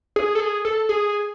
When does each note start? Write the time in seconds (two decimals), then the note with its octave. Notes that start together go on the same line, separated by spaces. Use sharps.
0.16 G#4
0.35 A4
0.40 G#4
0.65 A4
0.89 G#4